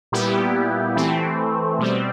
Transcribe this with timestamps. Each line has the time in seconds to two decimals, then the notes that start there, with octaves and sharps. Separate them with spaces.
0.12 A#2 G3 B3 E4 G4
0.96 E3 A3 C4
1.79 B2 G3 C4